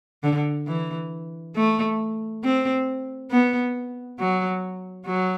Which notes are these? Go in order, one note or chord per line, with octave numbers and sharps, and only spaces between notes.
D3
E3
A3
C4
B3
F#3
F#3